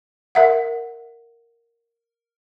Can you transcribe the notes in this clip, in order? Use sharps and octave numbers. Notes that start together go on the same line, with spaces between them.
A#4 E5 F#5